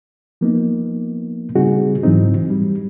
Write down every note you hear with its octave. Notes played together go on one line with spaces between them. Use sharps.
F3 A#3 B3 D#4
C#3 G3 C4 D#4 F#4 G#4
G#2 E3 F#3 C4 D#4
G3